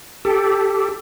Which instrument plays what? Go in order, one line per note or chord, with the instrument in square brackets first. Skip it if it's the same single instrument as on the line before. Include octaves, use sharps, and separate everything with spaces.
[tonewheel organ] G4 A4